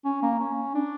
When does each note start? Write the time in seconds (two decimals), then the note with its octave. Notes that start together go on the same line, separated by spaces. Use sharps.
0.05 C#4
0.23 A#3
0.40 C#4
0.75 D4